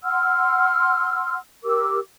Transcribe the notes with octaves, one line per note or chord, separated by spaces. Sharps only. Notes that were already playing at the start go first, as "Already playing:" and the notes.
F#5 C6 E6 F6
G4 A#4 D6 E6